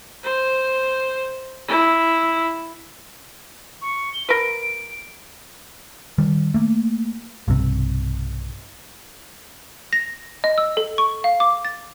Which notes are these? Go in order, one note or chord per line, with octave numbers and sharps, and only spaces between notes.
C5
E4
C#6
G7
A#4 B4 D7
D#3 G3
A3 A#3
B1 G2 C3
A#6
D#5
E6
A4
C#6
F5
D6
A6